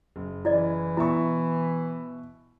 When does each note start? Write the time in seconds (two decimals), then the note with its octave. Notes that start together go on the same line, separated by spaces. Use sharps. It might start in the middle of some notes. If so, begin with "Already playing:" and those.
0.16 F#1
0.45 E3 E4 D5 D#5
0.97 B2 E4 E5 C#6